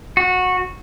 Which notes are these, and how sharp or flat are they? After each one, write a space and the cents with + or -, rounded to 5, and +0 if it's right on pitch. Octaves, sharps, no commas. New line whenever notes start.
F#4 -15